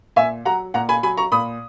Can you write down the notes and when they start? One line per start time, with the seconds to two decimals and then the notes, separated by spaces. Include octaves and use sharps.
0.16 A#2 E5 G#5
0.45 F#3 F#5 A#5
0.74 A#2 F#5 A#5
0.89 G#5 B5
1.03 F#3 G#5 B5
1.17 A#5 C#6
1.32 A#2 B5 D#6